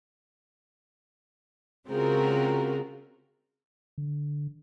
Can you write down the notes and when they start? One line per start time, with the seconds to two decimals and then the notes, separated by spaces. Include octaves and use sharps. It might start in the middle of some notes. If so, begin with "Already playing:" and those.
1.87 C#3 G#3 C4 F4 F#4 A#4
3.98 D3